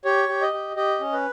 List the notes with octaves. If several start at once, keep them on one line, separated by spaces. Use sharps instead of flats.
G4 C#5
G4
D#5
G4
G4 D#5
C#4
B4